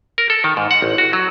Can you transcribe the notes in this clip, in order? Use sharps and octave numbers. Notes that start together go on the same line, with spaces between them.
A#4
A4
D#3
G#2
F#5
A1
F#4
F#3